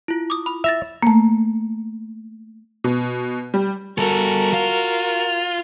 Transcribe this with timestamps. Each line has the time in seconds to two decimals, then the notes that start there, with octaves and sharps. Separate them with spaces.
0.08 E4 F4
0.30 D6 D#6
0.46 B5
0.64 E5 A6 A#6 F7
1.03 A3 A#3
2.84 B2
3.54 G3
3.98 G3 F#4 A4 A#4
4.53 F4